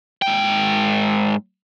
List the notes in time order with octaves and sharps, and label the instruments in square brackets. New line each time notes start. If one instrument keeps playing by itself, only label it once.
[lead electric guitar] G#2 G5